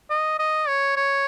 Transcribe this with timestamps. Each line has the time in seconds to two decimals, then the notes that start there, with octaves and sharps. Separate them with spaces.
0.10 D#5
0.39 D#5
0.68 C#5
0.96 C#5